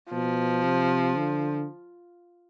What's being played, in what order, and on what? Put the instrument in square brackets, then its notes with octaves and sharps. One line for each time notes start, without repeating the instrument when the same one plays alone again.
[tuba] B2 [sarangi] F3
[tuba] C3
D3